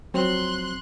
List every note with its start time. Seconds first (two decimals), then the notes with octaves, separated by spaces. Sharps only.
0.14 F3 F#3 C4 C6 F#6